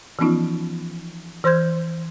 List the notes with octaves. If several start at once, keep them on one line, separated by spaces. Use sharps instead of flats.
E3 F3 B3 C#4 D#4 F4
E3 C5 C6 F6 G6 G#6